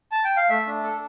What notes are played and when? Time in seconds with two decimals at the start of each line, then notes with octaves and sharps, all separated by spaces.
0.12 A5
0.25 G5
0.37 F5
0.49 A3 E5
0.67 D4
0.83 A4